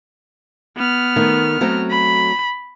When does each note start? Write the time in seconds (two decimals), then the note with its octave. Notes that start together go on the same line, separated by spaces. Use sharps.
0.77 B3 F6
1.16 D#3 A3
1.61 F#3 A3 C4
1.91 B5